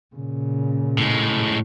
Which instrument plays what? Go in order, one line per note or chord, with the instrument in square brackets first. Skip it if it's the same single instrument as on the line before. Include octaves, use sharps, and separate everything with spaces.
[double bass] A#2 C#3
[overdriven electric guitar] A2 G#3